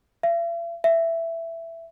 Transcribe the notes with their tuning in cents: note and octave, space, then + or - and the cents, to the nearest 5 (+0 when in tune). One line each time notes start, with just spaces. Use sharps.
E5 +45
E5 +10